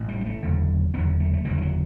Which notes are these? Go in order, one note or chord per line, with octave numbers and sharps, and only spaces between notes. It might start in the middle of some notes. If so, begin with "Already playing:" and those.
Already playing: A1 A2
G3
G3
A3
F#1 E2 D3
F#1 E2 D3 B3
A3
A3
F#1 E2 D3 G3
E3
F#3